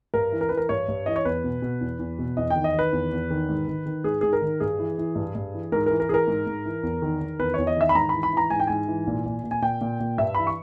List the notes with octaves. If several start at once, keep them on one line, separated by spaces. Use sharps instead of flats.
G2 A#4
E3
A#4
E3 B4
A#4
G2 C#5
G2
E3 D#5
C#5
E2 B4
B2
B2
E2
E2
B2
E2 D#5
G5
D#3
D#5
D#3 B4
E2
E2
D#3
G#2
D#3
D#3
G#2 G#4
G#2 G#4
A#4
D#3
G2 G#4
E3
E3
G2
G2
E3
G#2 A#4
E3 A#4
A#4
E3 G#4 A#4
G#2
G#2
E3
E2
D#3
D#3
E2 B4
E2 C#5
D#5
D#3 E5
B5
G#2 A#5
E3 B5
B5
E3 A#5
G#2 G#5
G5
G#2 G#5
E3
A#2
A#2
A#2
G#5
A#2 G5
A#2
A#2
G2 E5
E3 B5
C#6